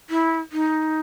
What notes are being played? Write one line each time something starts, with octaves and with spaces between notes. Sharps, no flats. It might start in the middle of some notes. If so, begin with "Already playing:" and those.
E4
D#4